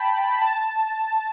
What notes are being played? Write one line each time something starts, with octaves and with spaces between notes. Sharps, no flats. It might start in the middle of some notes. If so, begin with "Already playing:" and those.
Already playing: G5 A5 B5
B5
A5